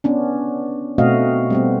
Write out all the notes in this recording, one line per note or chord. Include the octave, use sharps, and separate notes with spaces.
B3 C#4 D4
B2 A3 C4 F#4 D#5 F5
G3 B3 C4